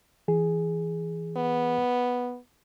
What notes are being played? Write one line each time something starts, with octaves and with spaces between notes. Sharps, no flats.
E3 G#4
B3